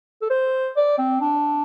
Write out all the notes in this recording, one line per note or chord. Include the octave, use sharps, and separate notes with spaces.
A4
C5
D5
C4
D4